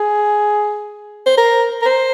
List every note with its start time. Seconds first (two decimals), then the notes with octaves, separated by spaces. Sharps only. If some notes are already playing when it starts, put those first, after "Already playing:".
Already playing: G#4
1.26 C5
1.38 A#4
1.82 A#4
1.85 C5